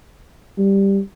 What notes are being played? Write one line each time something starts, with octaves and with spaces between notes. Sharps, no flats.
G3